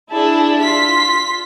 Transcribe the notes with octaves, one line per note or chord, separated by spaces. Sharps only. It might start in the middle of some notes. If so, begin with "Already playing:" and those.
D4 E4 G#4 A5
F4 C6 B6